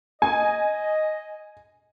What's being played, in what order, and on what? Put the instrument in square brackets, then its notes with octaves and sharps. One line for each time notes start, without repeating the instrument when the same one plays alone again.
[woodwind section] D#5 [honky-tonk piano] G#5